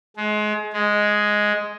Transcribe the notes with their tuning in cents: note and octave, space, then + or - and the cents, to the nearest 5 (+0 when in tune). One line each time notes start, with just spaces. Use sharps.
G#3 +30
G#3 +5